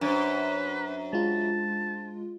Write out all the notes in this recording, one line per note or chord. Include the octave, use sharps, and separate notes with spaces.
F#2 D4 B4 C5
G#3 F4 A5